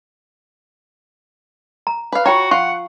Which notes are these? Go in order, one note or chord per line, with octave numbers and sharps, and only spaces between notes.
A#5
B4 F5
F4 F#4 C#5 G5 A#5
F4 F#5 C#6